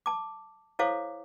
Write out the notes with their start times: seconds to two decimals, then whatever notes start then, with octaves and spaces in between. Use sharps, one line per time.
0.06 A5 D6
0.79 E4 A4 C5 C#5 F5 D6